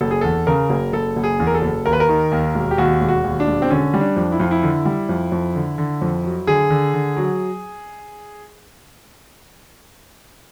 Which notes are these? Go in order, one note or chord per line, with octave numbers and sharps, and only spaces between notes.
F#1 A4
G#4
E2 A4
C#3 A#4
F#1
F#1 A4
F#1
G#4
E2
A#4
A4
F#1
D#2 A#4
B4
A#4
D#3
D#2
E1
G4
D#2 F#4
E1
F#4
D#2
D4
E1
C4
D3 C#4
G3
D4
F2
E4
F2 F4
E4
D3
G3
F2
F2
D3
D3
F2
F#3
D3 G#4
D3
D3
F#3